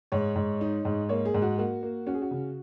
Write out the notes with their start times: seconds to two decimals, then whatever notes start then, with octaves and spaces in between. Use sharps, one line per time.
0.12 G#2 C#5
0.36 G#2
0.61 D#4
0.85 G#2
1.09 A#3 C#5
1.25 G#4
1.34 G#2
1.42 F#4
1.58 A#3 F#4
1.83 A#3
2.07 C#4 F#4
2.14 G#4
2.22 F#4
2.31 C#3